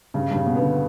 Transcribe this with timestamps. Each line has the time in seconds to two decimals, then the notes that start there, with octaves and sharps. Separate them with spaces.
0.14 G2 C#3
0.31 G2
0.36 C#3
0.46 B2
0.56 B3
0.61 D3